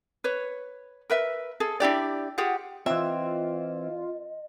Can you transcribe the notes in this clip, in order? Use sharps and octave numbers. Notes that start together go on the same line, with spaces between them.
B4 C#5
A#4 B4 E5
G#4 A4
D4 E4 G4 D5
F4 G4 G#4 F#5
E3 C4 F4 D#5 E5